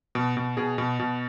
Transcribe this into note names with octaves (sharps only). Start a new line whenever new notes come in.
B2
B2
B2 G#4
B2
B2